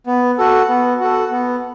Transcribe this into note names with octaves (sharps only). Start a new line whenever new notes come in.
B3
F#4 A4
B3
F#4 A4
B3